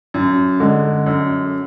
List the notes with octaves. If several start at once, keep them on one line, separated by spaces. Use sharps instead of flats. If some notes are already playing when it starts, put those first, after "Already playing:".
F#2
D3 G#3
F#2